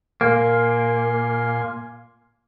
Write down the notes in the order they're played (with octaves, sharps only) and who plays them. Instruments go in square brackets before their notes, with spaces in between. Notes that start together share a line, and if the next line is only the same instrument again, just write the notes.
[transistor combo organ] A#2 G#5 C6 [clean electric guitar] A#3